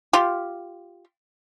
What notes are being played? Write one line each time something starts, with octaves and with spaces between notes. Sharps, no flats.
F4 G4